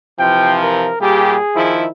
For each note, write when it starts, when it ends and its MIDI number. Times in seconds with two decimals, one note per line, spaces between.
0.19 0.91 48
0.19 0.91 52
0.19 0.91 53
0.19 0.55 79
0.62 1.01 70
1.01 1.37 46
1.01 1.37 55
1.01 1.37 67
1.01 1.78 68
1.55 1.87 51
1.55 1.87 53
1.55 1.87 64